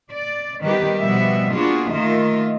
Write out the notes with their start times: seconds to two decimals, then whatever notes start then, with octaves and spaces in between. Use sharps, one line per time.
0.11 D5
0.64 D#3 G3 B3 D#4 G4 B4
0.98 B2 F3 G3 B3 E5
1.54 A#3 B3 D4 F4 F#4 G#4
1.91 D#2 D#3 A3 F4 D#5 E5